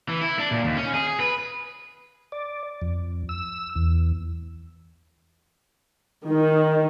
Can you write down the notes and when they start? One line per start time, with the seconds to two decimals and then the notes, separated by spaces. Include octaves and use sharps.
0.09 E3
0.21 E4
0.39 D4
0.51 A#2
0.65 D#2
0.77 C#4
0.94 G#4
1.07 G#4
1.20 B4
2.32 D5
2.82 F2
3.29 E6
3.76 E2
6.27 D#3